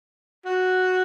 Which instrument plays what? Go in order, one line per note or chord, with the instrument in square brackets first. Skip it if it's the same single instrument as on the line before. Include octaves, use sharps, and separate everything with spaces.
[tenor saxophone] F#4